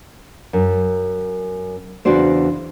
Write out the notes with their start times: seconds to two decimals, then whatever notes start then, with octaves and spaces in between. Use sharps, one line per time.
0.53 F#2
2.05 E2 C#3 D4 F#4 C5 D5